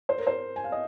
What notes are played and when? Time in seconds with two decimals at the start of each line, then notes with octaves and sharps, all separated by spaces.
0.09 C5
0.18 A#4
0.27 C5
0.56 G#5
0.64 F5
0.72 D#5